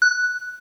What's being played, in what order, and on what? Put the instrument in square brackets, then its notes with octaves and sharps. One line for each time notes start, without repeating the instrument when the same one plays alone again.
[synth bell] F#6